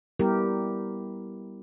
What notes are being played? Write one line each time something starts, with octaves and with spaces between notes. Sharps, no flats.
G3 B3 E4 G4 A#4